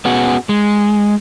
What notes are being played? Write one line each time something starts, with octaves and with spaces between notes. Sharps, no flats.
B3 C#4 F#4 G#4
G#3